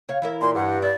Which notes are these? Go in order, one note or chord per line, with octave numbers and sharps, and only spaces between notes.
C#3 C#5 F5
E3 E4 A#4
A#2 C6
G2 F#5
E4 D5